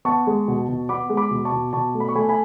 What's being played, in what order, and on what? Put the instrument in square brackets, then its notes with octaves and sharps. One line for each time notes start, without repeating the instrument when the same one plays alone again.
[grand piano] B3 A5 C#6
G#3
B2
B2
B3 B5 D6
G#3
B5 D6
B2
A5 C#6
B2
B2 A5 C#6
A3
B5
C#6
A3 G#5 B5
G#5 B5